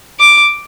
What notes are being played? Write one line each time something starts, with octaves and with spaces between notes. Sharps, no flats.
D6